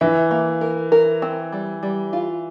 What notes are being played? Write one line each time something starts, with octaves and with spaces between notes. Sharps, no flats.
E3 E5
A#3
A#4
A#4
C4
G3
G3
F4